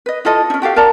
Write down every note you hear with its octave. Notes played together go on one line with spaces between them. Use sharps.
B4 D#5
E4 F4 A4 D#5
C#4 D#4
F#4 G4 A4 F5
A#4 D5 A5 A#5